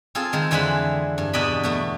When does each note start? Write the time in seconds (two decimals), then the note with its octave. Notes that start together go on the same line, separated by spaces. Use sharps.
0.15 C4 F4 G#4 A4
0.33 D#3 G#3
0.51 F2 D3 E3 G#3 C5 B5
1.18 G2
1.33 E2 B2 D4 D5 D#5 B5
1.63 B2 A3 B3